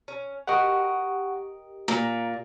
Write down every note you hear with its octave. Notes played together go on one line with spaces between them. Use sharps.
C#4
G4 A#4 D#5 F#5 C#6
A#2 A#5